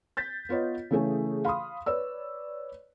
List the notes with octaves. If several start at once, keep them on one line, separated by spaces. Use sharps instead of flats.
G6 A6 B6
B3 F4 B4 C#5 D#5
C#3 E3 A3 G#4 C#5 G#5
F5 B5 C6 D#6
B4 C#5 D5 E6